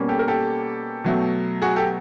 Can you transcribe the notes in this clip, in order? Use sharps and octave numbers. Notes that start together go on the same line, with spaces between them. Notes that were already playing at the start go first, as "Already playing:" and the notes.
Already playing: B2 G3 A#3 C#4
G4 A4
A#4
G4 A4
B2 F#3 A3
F#4 G#4
G4 A4